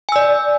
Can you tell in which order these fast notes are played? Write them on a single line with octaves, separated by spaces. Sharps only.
G#5 E6 D5